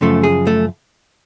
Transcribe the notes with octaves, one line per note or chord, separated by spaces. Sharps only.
F#2 C#3 F3 A3
G#4
A3